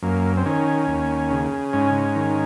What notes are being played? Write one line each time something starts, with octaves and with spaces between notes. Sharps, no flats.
F#2 A#3
C4
D#3 C#4
D#2
C#3
G#2 C#4
D#3